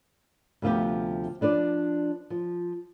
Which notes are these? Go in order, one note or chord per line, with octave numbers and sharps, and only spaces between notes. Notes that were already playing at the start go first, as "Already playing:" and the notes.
D2 C3 F3 B3 G4
F3 D4 B4 D5
F3